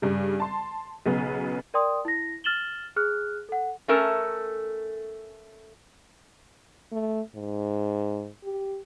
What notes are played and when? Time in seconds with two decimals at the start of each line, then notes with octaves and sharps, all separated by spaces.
0.02 G2 C#3
0.40 A5 C6
1.06 B1 C#3 F#3 B3
1.74 A#4 D5 G5 C6 D#6
2.05 E4 A#6
2.44 F6 A6 E7 F#7 G7
2.96 G#4 F6 F#6
3.49 A4 F#5
3.88 A3 C#4 A4 A#4 A5 A#5
6.92 A3
7.35 G#2
8.44 G4